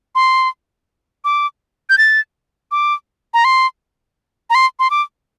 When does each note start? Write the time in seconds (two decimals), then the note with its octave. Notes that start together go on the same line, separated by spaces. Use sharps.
0.15 C6
1.25 D6
1.90 G6
1.98 A6
2.72 D6
3.34 A#5
3.45 C6
4.50 A#5
4.55 C6
4.79 C6
4.90 D6